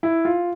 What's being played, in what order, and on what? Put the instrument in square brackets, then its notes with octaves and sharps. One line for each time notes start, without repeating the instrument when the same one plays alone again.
[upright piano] E4
F4